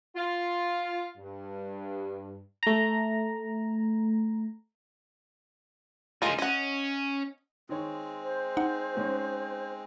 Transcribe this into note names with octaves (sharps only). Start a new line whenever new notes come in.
F4
G2
A3 A#5
C#2 G#3 D#4 F4 A#4
C#4 D#5 F#5
D#3 G#3 C4 C#5
C5
D#4 F#5
G#2 C#4